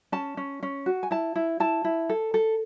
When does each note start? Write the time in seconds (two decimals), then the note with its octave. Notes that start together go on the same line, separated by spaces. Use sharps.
0.12 C#4 A5
0.37 C#4
0.63 C#4
0.86 F#4
1.03 G#5
1.11 E4 A5
1.36 E4
1.60 E4 A5
1.84 E4
2.10 A4
2.34 A4